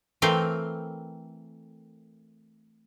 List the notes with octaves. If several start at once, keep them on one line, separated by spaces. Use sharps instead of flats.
E3 A3 C4 A#4 F5 G5